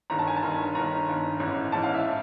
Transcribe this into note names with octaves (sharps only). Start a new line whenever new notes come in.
G1 G2 D#3 A#5
A5
G#5
A5
G1 G2 D#3
G1 G2 D#3 A#5
G1 G2 D#3
A1 G#2 E3
A1 G#2 E3 A5
F5
E5
E3